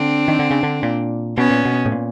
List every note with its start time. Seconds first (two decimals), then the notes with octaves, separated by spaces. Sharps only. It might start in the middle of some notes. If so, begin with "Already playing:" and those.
Already playing: D3 C4 D4
0.28 D#3
0.39 D3
0.51 C#3
0.63 D3
0.83 A#2
1.37 B2 B3 C#4
1.50 A#2
1.65 B2
1.85 A2
1.92 A#2